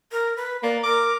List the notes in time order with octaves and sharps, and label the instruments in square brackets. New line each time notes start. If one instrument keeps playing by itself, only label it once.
[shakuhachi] A#4
B4
[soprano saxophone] A#3 [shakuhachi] D5
[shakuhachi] A#4 [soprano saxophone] D6